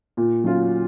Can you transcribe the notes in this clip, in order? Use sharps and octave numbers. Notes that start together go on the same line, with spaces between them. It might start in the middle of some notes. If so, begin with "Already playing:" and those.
A#2
F#3 C#4 F4